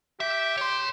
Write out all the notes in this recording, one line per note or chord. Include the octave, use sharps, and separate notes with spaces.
G4 E5
C#5 C6